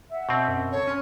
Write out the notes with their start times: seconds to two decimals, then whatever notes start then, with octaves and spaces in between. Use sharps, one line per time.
0.10 E5 F#5
0.29 B2 C4
0.48 F#2
0.72 A4 C#5 A5
0.87 C#4 C6 F6